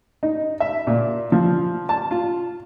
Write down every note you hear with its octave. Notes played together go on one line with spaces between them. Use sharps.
D#4
E5
A#2
F3
A5
F4